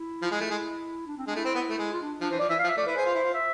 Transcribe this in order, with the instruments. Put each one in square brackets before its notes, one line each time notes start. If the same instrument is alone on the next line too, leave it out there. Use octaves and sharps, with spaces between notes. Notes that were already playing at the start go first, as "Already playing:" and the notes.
Already playing: [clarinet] E4
[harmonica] F3
G#3
A3
[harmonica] G#3 [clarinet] E4
[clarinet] D4
C4
[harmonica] G#3 [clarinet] D4
[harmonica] A3 [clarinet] E4
[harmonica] C4
B3
A3
G#3
[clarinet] F4
D4
[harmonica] F3 [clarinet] D4
[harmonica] E3 [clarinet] C5
[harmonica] F3 [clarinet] D5
[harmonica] E3 [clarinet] E5
[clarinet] F5
[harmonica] F3
[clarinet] E5
[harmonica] A3 [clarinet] D5
[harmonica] E4 [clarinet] B4
[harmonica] G#4 [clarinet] C5
[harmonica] F4
E4
F4
[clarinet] E5